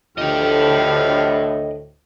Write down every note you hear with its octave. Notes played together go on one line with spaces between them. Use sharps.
D2 A2 F3 G4 D#5 G5 F6